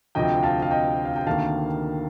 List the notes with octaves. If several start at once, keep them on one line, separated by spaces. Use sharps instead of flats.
D2 C3 F3 C4 D#5 G5
F5 A5
F5
D#5 G5
F5
G5
D2 C3 D#3 A#3 F5 A5